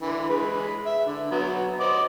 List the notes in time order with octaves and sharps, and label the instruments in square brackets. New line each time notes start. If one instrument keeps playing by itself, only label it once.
[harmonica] D3 E3
G#3 B4
E5
D3
F#3 B3
C5 D#5 D6